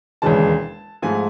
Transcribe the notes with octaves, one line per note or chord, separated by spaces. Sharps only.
E1 D#2 C#3 E3 G#3 A5
G#2 F3 A3 G#5